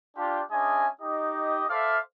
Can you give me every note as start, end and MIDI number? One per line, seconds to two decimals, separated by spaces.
0.17 0.41 62
0.17 0.41 65
0.17 0.41 67
0.51 0.87 56
0.51 0.87 61
0.51 0.87 62
0.51 0.87 75
0.51 0.87 76
0.51 0.87 80
1.01 1.64 63
1.01 1.64 67
1.01 1.64 75
1.69 1.98 69
1.69 1.98 72
1.69 1.98 74
1.69 1.98 76
1.69 1.98 77